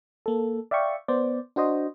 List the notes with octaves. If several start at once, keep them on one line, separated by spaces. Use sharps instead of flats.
A#3 A4
D5 E5 F5 G5 C#6
B3 C5 D5
D4 F#4 C5 D#5